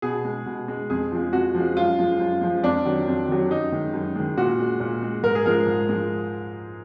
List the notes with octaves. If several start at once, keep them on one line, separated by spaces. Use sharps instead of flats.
B2 G#4
G#3
B2
G#3
F2 G#4
F3 G#3
F2 F#4
F3 G#3
F#2 F4
F3 G#3
F#2
F3 G#3
F2 D4
D#3 F#3
F2
D#3 F#3
F#2 D#4
D#3 G#3
F#2
D#3 G#3
A#2 F#4
G#3
A#2
G#3
G#2 A#4
G#4
F3 G#3 A#4
G#2
F3 G#3